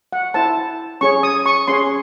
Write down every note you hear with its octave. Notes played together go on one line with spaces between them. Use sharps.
F#5
E4 C5 A5
C#4 G#4 C#5 C#6
D#6
C#6
C#4 G#4 C#5 C6